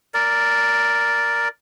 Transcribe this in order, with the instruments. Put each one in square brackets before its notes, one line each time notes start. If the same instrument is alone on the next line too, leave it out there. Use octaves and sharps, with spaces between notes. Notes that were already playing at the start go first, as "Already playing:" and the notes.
[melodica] A#4 D5